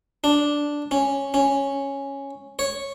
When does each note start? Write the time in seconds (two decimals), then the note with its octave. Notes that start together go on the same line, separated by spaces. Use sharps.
0.24 D4
0.91 C#4
1.34 C#4
2.59 C#5